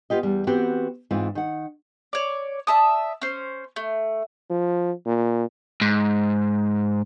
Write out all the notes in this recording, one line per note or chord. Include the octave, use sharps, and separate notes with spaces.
B3 F4 G4 D#5
E2 G3
E3 B3 C4 F#4 G4
G#2 E3 C4 F4
D#3 F#5
C#5 D5
D5 E5 A5 D#6
C#4 C5
A3
F3
A#2
G#2